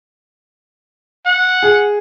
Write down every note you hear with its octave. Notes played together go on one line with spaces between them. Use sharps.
F#5
G#4